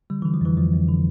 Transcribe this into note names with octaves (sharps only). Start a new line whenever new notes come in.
D3 G3
D3 E3
F3
F2 E3
F2 F3
F2
D3